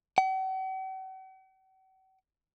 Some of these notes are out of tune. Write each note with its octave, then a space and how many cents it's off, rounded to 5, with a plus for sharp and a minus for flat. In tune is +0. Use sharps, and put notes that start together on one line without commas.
F#5 +45